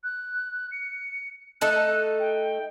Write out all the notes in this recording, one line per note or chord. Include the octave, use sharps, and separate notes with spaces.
F#6
C#7
A3 D#4 A4 F#6
G5